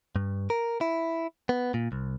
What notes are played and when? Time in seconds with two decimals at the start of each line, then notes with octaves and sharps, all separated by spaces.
0.16 G2
0.50 A#4
0.81 E4
1.49 B3
1.74 A#2
1.92 C2